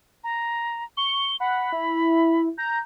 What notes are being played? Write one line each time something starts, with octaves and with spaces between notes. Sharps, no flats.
A#5
C#6 G7
F#5 B5
E4
A#5 G6